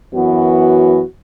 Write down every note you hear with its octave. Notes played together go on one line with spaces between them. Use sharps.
F#2 E3 B3 F#4